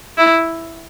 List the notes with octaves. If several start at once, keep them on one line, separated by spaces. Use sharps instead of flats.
E4